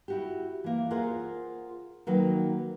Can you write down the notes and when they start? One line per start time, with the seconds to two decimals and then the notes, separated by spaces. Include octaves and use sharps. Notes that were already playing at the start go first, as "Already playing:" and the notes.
0.08 E4 F#4 G4
0.64 E3 A#3
0.91 F4 G#4 A#4 C5 F#5
2.07 D#3 F#3 A#3 B4